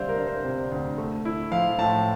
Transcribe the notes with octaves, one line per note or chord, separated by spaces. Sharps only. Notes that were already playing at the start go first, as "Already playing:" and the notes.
Already playing: D2 C3 G3 C5 D5 E5 F5
A#4
D4
C5
C3
D2
A3
E4
F3 F5
A2 A5